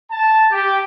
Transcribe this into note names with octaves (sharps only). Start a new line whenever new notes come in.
A5
G4